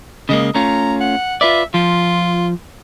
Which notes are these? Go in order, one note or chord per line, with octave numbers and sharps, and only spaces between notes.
C#3 G#3 A#3 D#5
A3 C#4 F4 A#5
F#5
F4 B4 D5 E5
F3 F4